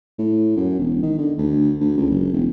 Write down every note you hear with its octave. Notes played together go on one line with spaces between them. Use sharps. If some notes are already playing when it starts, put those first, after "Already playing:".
A2
F#2
E1
D#3
D3
D2
D2
C#2
F#1
E1